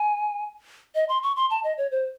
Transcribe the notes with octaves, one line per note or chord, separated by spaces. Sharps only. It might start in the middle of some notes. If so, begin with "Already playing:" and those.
Already playing: G#5
D#5
C6
C#6
C6
A5
D#5
C#5
C5